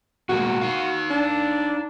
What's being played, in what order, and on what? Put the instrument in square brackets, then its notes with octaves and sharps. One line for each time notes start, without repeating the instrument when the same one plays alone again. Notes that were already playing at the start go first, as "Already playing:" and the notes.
[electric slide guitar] B2 G#3 A#3 [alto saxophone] F#4
[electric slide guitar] D#4 F5
[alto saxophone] D4